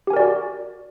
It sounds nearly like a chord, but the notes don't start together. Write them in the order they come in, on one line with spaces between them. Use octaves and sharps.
G4 G#5 A#4 D5 F#4